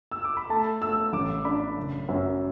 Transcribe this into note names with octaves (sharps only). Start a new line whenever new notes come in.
E6
D6
B5
A3 A5
A3 E6
A1 D6
D4 B5
F#1
F#2